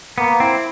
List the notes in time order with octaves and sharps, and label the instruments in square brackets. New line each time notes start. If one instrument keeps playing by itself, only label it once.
[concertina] A#3 [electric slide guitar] B3
[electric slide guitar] C4 [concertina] E4